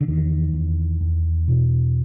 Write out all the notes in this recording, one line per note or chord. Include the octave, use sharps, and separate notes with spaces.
D3
E2 D#3
E2
E2
B2